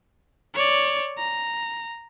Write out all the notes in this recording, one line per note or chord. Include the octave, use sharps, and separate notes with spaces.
C#5 D5
A#5